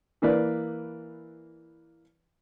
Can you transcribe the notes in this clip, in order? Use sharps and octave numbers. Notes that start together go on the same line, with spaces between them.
E3 A#3 B4 D5